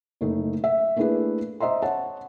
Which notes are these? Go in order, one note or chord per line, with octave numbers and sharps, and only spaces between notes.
F#1 A3 D#4
E5
A3 A#3 D4 E4 G#4 B4
C5 D#5 E5 A#5 C6
C#5 F#5 A5